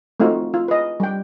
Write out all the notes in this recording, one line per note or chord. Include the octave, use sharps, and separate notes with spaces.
A3 C4 D#4 F4 F#4
F4
B4 D#5
G3 G5